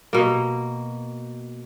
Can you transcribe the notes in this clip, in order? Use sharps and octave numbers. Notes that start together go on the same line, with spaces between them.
B2 A#3